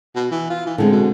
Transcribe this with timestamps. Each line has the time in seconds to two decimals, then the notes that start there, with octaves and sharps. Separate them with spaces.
0.15 B2
0.31 E3
0.50 F4
0.66 E3
0.78 A2 D3 G#3 C4
0.92 B2